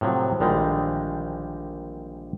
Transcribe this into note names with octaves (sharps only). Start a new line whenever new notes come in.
A2 C3 F3 F#3
A#1 D3 D#3 G3 G#3